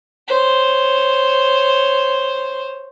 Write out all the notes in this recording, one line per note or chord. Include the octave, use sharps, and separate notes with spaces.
C5 C#5